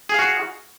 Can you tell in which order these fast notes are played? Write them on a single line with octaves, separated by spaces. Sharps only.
G#4 F5 F#4